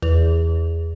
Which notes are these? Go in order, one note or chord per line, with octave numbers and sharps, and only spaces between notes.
E2